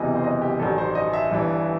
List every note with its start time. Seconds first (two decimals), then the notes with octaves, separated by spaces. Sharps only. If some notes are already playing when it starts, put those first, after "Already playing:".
Already playing: F#1 E2 C3 E3 D#5
0.16 C5
0.24 D#5
0.42 G4
0.59 A1 G2 D#3 F#3 A4
0.78 C5
0.95 D#5
1.13 E5
1.31 G1 G2 E3